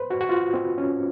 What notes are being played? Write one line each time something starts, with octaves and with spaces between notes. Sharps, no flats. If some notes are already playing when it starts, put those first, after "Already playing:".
Already playing: B4 C5
F#4
F#4
F4
C4
C#4